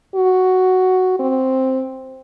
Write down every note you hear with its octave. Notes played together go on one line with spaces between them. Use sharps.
F#4
C4